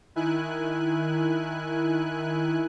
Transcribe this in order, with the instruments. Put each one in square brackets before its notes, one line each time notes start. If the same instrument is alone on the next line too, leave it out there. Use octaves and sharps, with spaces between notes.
[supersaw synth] D#3 E4 G#5 F#6